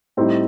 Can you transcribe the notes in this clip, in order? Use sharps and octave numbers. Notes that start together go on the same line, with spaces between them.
A2 G3 C4 D#4